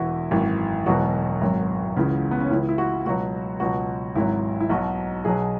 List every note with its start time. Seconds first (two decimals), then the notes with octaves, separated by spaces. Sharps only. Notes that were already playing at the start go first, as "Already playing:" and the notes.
Already playing: E1 E2 E3 E4 F#4
0.31 G#1 F#2 E3 F#4
0.86 E1 E2 B2 F#3 F#4
1.41 G#1 F#2 F#3
1.96 C#2 C#3 E3
2.31 B3
2.40 C#4
2.51 C#2 C#3 E3 E4
2.69 E4
2.78 F#4
3.05 C#2 B2 F#3 F#4
3.60 C#2 B2 F#3 F#4
4.15 G#1 G#2 F#3 E4
4.60 E4
4.69 B1 B2 F#3 F#4
5.25 B1 B2 F#3 G#4